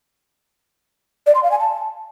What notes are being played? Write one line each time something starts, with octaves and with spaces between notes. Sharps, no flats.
D5
C6
F5
G#5
A5